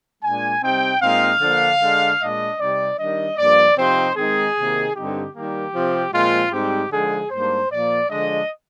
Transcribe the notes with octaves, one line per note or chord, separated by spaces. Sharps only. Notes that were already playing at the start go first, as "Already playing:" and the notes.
A#2 G#3 D4 G#5
C3 G3 C4 D#4 G5
A#2 G#3 C4 D#4 F5
D3 F3 A#3 D4
D3 G#3 D4
A#2 G#3 D4 D#5
C3 G3 C4 D#4 D5
D#3 G3 D4 D#5
G2 F3 A#3 D5
C3 F3 C4 D#4 C5
D#3 G#3 C4 D#4 G#4
C3 D#3 A#3 D#4
G2 D3 G3 C4 D#4 G4
D#3 G3 A#3 G4
C3 F3 C4
A#2 F3 G#3 C4 F4
G#2 G3 C4 D#4 G4
D3 F3 G#3 D#4 G#4
G#2 G3 A#3 D4 C5
A#2 F3 A#3 D5
D3 F3 G#3 D4 D#5